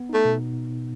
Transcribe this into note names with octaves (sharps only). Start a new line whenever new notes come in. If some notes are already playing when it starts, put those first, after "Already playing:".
Already playing: B3
A3 D#4
B2